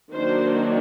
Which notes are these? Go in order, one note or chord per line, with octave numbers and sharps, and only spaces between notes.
D#3 F#3 A#3 D4 C5